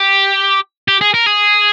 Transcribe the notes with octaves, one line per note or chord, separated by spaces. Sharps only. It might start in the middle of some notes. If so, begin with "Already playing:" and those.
Already playing: G4
G4
G#4
A#4
G#4